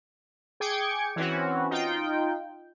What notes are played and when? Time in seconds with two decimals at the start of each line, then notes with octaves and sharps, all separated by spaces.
0.60 G#4 G5 D6 G#6 C#7
1.16 E3 C4 C#4 F#4
1.70 D#4 F4 G5